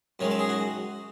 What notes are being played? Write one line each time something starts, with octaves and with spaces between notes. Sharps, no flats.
F#2 D#3 G#3 C#5
A4
G#4
F#4